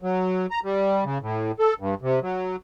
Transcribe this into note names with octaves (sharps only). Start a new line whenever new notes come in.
F#3
A#5
G3
C#3
A2
A4
G2
C3
F#3